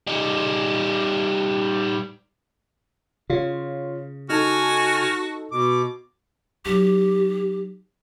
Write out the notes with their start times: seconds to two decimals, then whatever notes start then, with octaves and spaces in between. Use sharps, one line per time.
0.07 G3 D#4
3.30 C#3 F4 C#5
4.30 D#4 F#4 A4 G#5 F6
5.52 B2 D6
6.65 F#3 D#4 G4